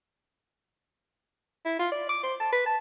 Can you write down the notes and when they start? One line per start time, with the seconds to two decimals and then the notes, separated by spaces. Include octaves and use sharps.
1.65 E4
1.79 F4
1.92 D5
2.09 D6
2.23 C5
2.40 A5
2.52 B4
2.66 A5